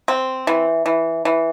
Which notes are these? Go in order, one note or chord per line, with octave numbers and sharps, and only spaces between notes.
C4
E3
E3
E3